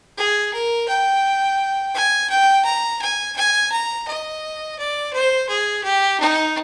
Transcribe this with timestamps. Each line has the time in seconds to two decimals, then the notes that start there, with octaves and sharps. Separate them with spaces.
0.18 G#4
0.53 A#4
0.88 G5
1.95 G#5
2.30 G5
2.65 A#5
3.01 G#5
3.37 G#5
3.72 A#5
4.08 D#5
4.78 D5
5.13 C5
5.49 G#4
5.84 G4
6.20 D#4